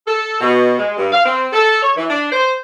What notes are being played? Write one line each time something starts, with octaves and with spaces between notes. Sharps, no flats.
A4
B2
G#3
G2
F5
C4
A4
C#5
E3
D4
C5